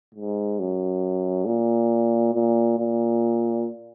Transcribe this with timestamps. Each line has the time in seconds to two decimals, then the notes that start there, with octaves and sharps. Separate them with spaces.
0.15 G#2
0.59 F#2
1.46 A#2
2.33 A#2
2.78 A#2